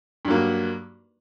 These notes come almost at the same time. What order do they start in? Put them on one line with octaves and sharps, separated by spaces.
G2 F#3 A#3